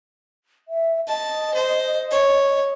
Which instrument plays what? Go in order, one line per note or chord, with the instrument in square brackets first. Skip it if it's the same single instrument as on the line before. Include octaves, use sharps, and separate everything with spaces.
[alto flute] E5
[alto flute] D#5 [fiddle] A5
[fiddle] C5
C#5